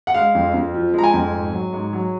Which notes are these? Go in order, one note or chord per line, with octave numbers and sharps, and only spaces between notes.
F#5
G#3 F5
F2
F2
F3
G#3 A#5
G#5
F2
G#2
F#3
G#2
F#3